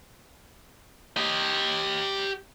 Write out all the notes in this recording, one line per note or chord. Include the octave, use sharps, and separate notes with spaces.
G4 D#5